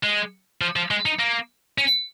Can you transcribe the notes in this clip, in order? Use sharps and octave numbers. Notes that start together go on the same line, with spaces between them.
G#3
F3
F3
G#3
D#4
A#3
C#4